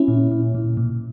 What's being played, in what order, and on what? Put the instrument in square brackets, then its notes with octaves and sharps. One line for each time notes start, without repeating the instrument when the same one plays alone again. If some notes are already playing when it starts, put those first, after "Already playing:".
Already playing: [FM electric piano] C#4 E4
A#2
A#2
A#2
A#2